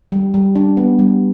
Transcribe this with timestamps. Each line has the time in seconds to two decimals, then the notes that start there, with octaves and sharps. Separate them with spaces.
0.12 G3
0.34 G3
0.55 D4
0.77 B3
0.99 G3